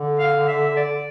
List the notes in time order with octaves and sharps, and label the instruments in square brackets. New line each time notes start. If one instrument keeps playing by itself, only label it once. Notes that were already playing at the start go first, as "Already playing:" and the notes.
Already playing: [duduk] D3
[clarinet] F5
E5
D5